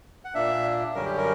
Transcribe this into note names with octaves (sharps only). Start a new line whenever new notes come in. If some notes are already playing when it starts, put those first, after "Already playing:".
F#5
A#2 A#3 D4 E5
F#2 D3 G3 C#4 A#4
G4
A#4